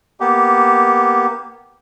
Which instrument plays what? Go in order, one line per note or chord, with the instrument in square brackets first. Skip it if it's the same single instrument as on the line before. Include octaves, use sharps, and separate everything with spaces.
[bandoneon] A#3 B3 G4